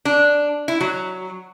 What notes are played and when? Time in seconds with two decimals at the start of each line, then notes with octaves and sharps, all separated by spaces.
0.05 D4
0.68 E4
0.81 F#3